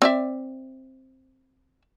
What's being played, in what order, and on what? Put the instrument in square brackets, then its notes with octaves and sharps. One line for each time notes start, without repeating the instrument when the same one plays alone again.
[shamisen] C4 D5 E5